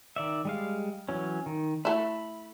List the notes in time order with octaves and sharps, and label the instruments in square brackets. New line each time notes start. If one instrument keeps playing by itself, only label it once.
[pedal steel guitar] D#3 D5 E5
G3 G#3 F5
E3 F#3 C#4
D#3
[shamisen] A3 E4 [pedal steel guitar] B5